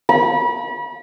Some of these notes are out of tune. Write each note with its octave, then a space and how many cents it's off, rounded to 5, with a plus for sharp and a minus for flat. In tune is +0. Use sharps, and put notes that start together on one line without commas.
B5 -35